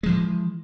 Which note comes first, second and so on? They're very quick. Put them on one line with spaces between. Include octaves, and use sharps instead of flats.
G#3 F3 E3